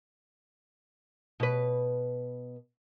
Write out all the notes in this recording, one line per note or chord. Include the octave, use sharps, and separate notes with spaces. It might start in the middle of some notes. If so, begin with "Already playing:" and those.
B2 B4